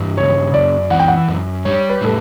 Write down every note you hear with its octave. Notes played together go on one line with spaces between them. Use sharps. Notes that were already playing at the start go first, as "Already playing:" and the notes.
Already playing: G2 E3
C#3 C#5
F#2 D5
E3 F#5
G5
F#5
F#2
G3 C#5
B4
A2 A4